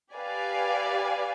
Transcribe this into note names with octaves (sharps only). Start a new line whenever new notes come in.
G4 B4 D5 F5 G#5